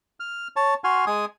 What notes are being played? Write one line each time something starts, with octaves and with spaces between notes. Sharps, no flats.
F6
C#5 A5
F#4 G#5 C6 F6
G#3 G#5 D#6